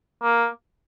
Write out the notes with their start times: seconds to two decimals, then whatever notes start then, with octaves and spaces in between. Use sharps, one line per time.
0.23 A#3